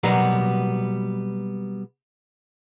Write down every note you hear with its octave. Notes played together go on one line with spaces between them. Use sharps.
B2 F#3 G3 A#3 B3